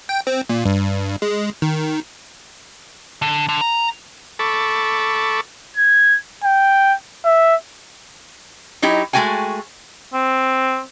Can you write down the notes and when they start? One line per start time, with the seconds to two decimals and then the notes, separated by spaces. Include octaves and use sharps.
0.09 G5
0.27 C4
0.49 A#2
0.65 G2
1.22 G#3
1.62 D#3
3.22 D3
3.49 D3
3.61 A#5
4.39 A4 A5 B5 C#6 D6
5.77 G#6
6.44 G5
7.25 E5
8.82 F#3 D#4 E4 G4
9.13 G#3 A3 F#4 G5 G#5
10.13 C4